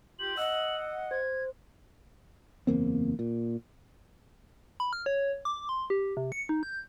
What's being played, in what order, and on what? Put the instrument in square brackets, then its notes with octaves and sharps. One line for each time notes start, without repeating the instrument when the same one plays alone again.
[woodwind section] F4 G4 [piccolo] F#7
[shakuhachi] D#5 [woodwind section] F#5 [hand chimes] E6
[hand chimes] C5 [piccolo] G#6
[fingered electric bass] F#1 E2 A#3 C4
A#2
[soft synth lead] B5
F6
C#5
D6
C6
G4
C3
C#7
D#4
G6